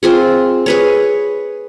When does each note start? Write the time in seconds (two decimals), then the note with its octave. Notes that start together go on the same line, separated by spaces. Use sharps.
0.03 C4 F4 G#4
0.66 G#4 B4 C#5